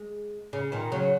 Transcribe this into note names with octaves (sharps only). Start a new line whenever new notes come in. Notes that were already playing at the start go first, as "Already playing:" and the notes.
Already playing: G#3
C#3
A#2 D#3
C#3 F#3